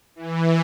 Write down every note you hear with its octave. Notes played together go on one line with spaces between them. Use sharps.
E3